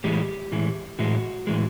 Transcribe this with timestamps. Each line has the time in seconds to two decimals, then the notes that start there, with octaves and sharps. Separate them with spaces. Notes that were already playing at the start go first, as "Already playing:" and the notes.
0.04 A2 E3 G#3 G4
0.52 A2 E3 G#3
0.99 A2 E3 G#3 F#4
1.47 A2 E3 G#3